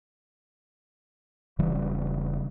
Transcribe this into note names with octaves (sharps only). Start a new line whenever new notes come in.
E1 C#3 E3 G3